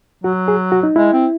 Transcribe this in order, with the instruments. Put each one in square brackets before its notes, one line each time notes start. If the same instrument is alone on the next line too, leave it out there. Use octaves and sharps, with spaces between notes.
[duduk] F#3 [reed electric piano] F#4
[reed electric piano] G#4
F#4
D#4
[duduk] G#3 [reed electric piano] E4
[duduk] C4